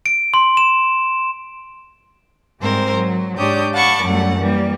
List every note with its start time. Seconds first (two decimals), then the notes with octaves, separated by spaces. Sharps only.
0.06 D7
0.34 C6
0.57 E7
2.62 G#2 G3 C4 A#4 C5
2.94 F#3
3.38 G#2 D4 G4 C#5 D#6 G6
3.74 F5 F#5 A5 B5 C#6 D6
4.03 F#2 F#3 G3 A3 F#5
4.40 E3 G3 A#3